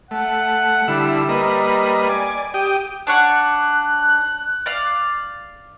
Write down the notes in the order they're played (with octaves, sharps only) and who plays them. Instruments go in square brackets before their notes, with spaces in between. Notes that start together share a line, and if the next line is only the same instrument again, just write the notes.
[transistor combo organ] A3 [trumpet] F#5
[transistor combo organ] D3 E4 E6 [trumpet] G3
[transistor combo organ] A#3 B4 D#5
D5 G#5
G4 G5 D#6
[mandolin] D4 C#5 F#5 [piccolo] F#6
[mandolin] D5 F5